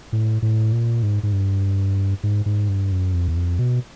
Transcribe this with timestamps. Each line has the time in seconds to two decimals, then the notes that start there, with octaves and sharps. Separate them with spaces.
0.13 A2
0.42 A2
0.72 A#2
1.03 G#2
1.23 G#2
1.33 G2
2.23 G#2
2.46 G#2
2.69 G2
2.92 F#2
3.14 F2
3.28 E2
3.36 F2
3.59 B2